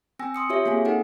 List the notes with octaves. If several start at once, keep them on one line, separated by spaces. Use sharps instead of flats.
C4 G5 G#5 E6 A#6
C6 D#6 C#7
F4 G4 C#5 E5
A#3 C4 G#4 F5 G#5
D#4 A4 F#5